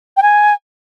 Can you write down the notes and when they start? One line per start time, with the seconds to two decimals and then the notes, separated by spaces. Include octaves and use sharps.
0.17 G5
0.22 G#5